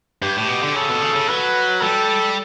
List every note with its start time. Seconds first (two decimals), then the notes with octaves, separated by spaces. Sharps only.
0.22 G2 G4
0.36 A2
0.48 B2
0.63 D3
0.75 C#3 A4
0.89 B2
1.02 C#3
1.15 C#3
1.29 F#3 B4
1.82 G3 A4